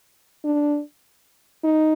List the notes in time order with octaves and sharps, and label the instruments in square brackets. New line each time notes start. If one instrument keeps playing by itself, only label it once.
[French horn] D4
D#4